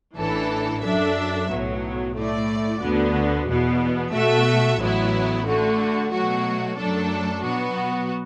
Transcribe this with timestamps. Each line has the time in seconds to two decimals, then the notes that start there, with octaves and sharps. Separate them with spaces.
0.17 A1 A2 E3 D4 A4
0.83 F#2 F#3 D4 A4 E5
1.49 B1 A2 F#3 B3
2.15 A2 A3 E4 D5
2.81 D2 D3 B3 F#4
3.47 E2 B2 B3
4.13 B2 A3 F#4 A4 E5
4.80 A1 A2 F#3 B3 E4
5.46 D3 A3 F#4
6.12 B2 F#3 A3 F#4
6.78 F#2 F#3 A3 D4 A4
7.44 B2 F#3 B3 F#4